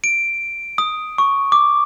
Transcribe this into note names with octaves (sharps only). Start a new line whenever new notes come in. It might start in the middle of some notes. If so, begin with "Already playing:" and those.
D7
D#6
C#6
D6